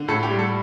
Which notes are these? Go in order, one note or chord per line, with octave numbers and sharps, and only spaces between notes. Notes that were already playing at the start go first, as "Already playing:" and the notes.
Already playing: D3
A2 A4
G4
G3
A4